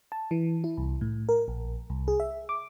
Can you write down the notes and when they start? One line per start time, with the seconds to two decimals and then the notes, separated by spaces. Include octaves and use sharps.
0.12 A5
0.31 E3
0.64 E4
0.77 C2
1.01 A2
1.29 A#4
1.48 A#1
1.90 C2
2.08 G#4
2.20 E5
2.49 D6